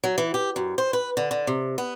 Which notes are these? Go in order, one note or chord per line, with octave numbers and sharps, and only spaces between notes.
F#3
E3
G4
F#2
C5
B4
D3
D3
C3
B3